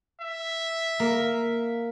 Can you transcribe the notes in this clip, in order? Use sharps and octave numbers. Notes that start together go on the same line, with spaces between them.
E5
A#3